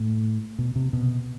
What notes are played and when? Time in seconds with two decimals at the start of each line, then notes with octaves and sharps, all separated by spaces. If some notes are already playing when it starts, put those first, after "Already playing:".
Already playing: A2
0.58 B2
0.76 C3
0.93 B2